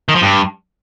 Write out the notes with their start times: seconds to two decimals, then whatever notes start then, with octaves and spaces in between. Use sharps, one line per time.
0.09 D#3
0.15 F3
0.22 G2